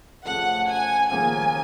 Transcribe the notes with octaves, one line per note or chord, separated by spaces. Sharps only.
F2 C#3 F3 A3 F#5
G#5
D#2 C#3 F3 A#3 G#5